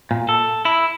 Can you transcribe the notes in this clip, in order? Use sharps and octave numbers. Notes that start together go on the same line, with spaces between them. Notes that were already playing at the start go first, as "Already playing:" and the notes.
A#2
A4
E4